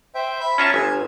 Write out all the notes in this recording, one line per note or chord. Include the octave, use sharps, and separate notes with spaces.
C5 E5 G5
E5 B5
C#4 F4 E5 A5 A#5
G1 G#5